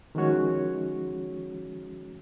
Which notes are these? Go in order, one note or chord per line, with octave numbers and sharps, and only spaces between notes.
D#3 F3 G#3 C#4 F#4 C#5